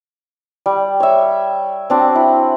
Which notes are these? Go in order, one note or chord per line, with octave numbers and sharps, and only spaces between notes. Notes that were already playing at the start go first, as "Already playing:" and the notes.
G3
C#5 E5
C4 D4 F#4
E4